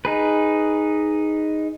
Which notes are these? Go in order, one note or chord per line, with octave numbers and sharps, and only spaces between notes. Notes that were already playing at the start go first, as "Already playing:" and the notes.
D#4 G#4 B4